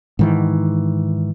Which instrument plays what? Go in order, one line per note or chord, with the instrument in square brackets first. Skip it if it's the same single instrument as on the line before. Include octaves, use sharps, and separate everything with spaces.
[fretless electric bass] G#2 D#3 E3